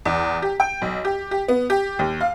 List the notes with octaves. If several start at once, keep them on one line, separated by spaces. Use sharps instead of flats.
E2
G4
G5
B1
G4
G4
B3
G4
D#2
F5